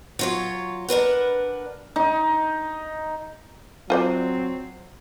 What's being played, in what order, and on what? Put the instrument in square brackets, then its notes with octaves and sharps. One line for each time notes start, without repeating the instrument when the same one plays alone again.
[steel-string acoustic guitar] F#3 F4 C#5
D4 A#4 B4 F#5
[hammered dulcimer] D#4
[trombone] F#3 [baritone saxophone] C4 [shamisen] F4 C5 D5